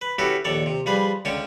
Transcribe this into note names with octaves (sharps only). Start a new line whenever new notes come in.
B4
C#4 E4 F#4 G4 A4 B4
A#1 D#2 A4 C#5 D5
C3
F3 G3 G#4 B4
C#2 D3 C#4 C#5 G5 A5